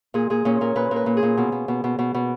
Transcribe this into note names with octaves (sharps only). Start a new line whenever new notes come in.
A#2 G#4
A#2 G#4
A#2 C#4
A#2 A#4
A#2 B4
A#2 A#4
B4
A#2
G#4
A#2
B2
B2
B2
B2
B2
B2